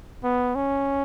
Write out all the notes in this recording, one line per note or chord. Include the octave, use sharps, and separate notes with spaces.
B3
C#4